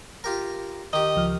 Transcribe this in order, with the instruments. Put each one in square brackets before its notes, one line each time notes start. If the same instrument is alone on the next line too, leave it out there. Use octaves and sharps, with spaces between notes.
[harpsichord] F4 G4 A#4
[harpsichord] D#3 G4 [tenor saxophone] D#5
[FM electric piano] C#2 F3 F6